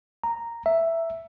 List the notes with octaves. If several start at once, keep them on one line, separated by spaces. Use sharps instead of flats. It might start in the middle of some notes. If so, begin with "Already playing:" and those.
A#5
E5